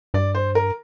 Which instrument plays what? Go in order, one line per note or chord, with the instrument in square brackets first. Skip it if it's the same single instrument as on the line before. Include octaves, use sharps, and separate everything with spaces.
[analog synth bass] G2 [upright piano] D5
[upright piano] C5
A#4